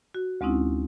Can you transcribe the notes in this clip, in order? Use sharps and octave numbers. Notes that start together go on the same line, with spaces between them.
F#4
D2 G#3 C4 C#4 D#4 E4